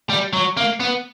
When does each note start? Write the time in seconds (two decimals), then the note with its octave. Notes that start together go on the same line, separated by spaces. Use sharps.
0.10 G3
0.33 F#3
0.57 A#3
0.80 B3